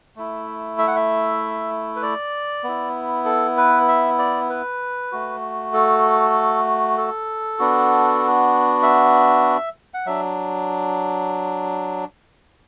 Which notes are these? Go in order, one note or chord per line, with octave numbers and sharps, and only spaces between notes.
A3 E4
E5
F#5
E5
B4
D5
B3 E4
A4
B4
E5
D5
B4
A3 F#4
A4
A4
B3 D4 F#4
E5
F#5
F#3 D4 E5